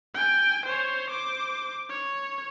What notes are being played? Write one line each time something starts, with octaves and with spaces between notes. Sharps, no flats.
G5 G#5
C5 C#5
C5 D6
C#5